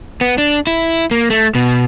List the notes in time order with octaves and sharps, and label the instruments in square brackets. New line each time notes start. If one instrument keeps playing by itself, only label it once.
[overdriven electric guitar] B3
D4
E4
A#3
A3
B2